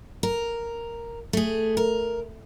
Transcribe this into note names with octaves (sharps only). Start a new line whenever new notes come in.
A#4
A3 G#4
A#4